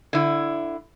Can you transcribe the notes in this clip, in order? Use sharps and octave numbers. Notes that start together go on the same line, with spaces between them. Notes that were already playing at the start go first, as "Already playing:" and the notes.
D3 E4